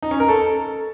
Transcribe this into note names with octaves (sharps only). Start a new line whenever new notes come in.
D#4
C#4
A#4
A4